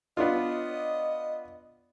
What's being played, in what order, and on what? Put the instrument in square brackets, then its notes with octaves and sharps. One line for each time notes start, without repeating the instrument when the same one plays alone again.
[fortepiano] B3 D4 F4 [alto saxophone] D#5